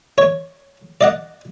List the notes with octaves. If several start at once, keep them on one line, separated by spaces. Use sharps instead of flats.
C#5
D5 D#5 F#5